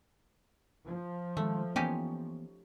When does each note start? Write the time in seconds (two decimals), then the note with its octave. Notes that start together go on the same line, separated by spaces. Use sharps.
0.85 F3
1.37 D#3 G#3 A3
1.76 E3 A#3 B3 C#4 D#4 G4